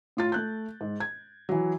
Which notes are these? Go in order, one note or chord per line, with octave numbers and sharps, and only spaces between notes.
A2 F4 A6
A3 F#6 G6
G#2
G#6
E3 F#3